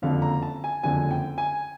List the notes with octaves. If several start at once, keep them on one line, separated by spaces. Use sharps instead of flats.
F#1 F2 D3 F5
A#5
A5
G#5
F#1 F2 D3 G#5
G5
G#5